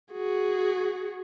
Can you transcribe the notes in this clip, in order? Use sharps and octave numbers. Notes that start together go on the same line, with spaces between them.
F#4 G#4